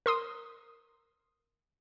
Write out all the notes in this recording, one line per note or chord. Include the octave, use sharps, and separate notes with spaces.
A#4 C6 D#6